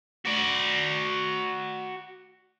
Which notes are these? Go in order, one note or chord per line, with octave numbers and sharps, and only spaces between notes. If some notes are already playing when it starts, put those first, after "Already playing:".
F#4 D5